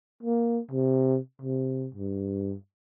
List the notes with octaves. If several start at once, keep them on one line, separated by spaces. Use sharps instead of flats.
A#3
C3
C3
G2